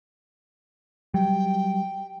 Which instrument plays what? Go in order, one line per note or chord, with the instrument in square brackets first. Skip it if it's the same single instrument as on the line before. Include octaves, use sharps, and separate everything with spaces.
[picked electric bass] F#3 G3 [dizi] G5